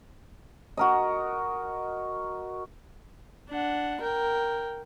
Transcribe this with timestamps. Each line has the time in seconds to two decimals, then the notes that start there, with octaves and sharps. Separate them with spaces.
0.77 F#4 A#4 D#5
3.50 D4 F#5
4.01 A#4 G5